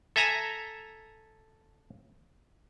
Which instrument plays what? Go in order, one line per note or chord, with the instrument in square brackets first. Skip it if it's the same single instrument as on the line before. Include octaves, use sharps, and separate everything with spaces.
[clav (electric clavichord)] A4 E5 G#5 A#5